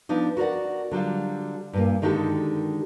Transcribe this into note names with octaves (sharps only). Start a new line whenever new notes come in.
F3 B3 D4 D#4
F#4 A#4 D5 F#5
D3 F#3 G3 F4
G2 A#2 A#3
D3 D#3 G#3 F#4 G4 A4